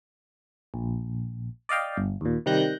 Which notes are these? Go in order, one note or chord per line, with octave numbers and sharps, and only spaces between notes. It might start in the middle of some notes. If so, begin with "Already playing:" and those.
A#1
D5 D#5 F5 G5
G1
D#2 A#2
C3 D#3 G3 F#6 G6 A#6